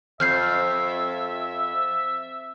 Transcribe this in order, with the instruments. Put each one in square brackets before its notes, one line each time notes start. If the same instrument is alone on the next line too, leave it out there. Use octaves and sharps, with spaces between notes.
[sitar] F2 [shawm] E5 [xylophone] F6 G6 C7